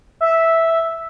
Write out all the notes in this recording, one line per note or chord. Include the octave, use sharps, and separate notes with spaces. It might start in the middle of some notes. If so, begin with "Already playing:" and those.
E5